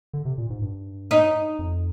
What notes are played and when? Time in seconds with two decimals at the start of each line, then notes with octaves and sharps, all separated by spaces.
0.13 D3
0.25 C3
0.38 A#2
0.50 G#2
0.62 G2
1.11 D#4
1.59 F2